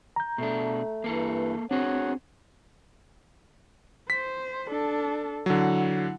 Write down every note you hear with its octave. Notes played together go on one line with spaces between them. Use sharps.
A#5 G6
B2 A3 D4
G2 E3 A#3 A4
C4 D4 F#4 G#4 C#5 F#5
C5 B6
D4 A4
D3 F#3 E4 F#5